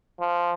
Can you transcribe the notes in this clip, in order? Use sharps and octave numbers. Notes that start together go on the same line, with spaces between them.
F3